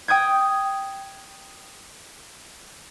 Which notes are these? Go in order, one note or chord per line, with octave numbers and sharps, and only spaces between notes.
G5 D#6 G6 G#6